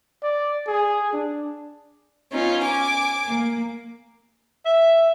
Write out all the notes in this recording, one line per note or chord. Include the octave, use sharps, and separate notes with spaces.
D5
G#4
D4
B3 C#4 D#4 F4
G#5 D6
A#3
E5